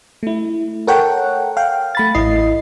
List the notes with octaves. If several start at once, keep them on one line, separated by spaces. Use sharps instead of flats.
A3 E4
A4 A#4 C#5 F#5 G5
F5 G5
A3 B5 A6
A1 E4 D#5 C7